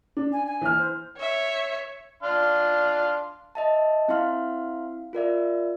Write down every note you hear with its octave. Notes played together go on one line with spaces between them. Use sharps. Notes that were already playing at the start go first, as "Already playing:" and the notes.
D4
G#5
G#5
E3 F6
C5
C#5 E5
D4 F5 C6
D#5 E5 A5
C4 E4 E5 F5 C6 F6
F4 A#4 D5 E5